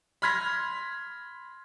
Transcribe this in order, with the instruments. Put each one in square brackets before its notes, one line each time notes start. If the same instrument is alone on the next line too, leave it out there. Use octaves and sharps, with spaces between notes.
[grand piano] B5 C6 F6 G#6 A#6 B6